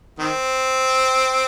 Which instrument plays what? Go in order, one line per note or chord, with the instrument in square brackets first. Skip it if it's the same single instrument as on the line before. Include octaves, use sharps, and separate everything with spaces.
[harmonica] D#3 C4